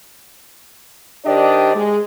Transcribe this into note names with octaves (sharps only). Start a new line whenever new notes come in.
D#3 D4 G4 C5 D5 D#5
G#3